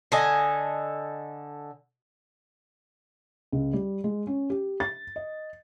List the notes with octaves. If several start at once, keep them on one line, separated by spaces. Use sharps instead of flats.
D3 A4 D#5 G#5
C#2
G3
G#3
C#4
G4
A6
D#5